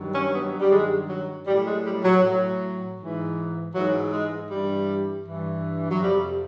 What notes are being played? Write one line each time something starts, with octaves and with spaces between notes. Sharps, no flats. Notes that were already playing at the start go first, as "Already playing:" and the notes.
Already playing: G2 D#3 F#3
C#4
B3
G3
G2 D#3 F#3 G#3
F#3
A2 F#3 G3
G#3
G3
F#3
A2 F#3
G#2 E3
G#2 E3 F#3
G#3
G2 E3 G3
G2 E3
F#3
F2 C3 F3 G3